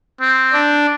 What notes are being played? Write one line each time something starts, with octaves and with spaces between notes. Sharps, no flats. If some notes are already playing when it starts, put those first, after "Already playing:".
C4
D4